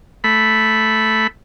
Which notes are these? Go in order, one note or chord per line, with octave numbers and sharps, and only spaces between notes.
A3 B5